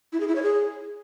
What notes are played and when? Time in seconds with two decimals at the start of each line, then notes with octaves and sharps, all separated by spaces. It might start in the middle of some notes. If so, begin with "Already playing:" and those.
0.13 E4
0.20 G#4
0.28 E4
0.35 C#5
0.43 G#4